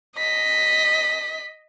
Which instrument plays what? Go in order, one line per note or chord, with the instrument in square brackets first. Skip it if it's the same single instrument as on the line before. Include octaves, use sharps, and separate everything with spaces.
[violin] D#5 B6